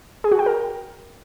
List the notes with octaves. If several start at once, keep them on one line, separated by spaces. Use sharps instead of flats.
G#4
F#4
G5
A#4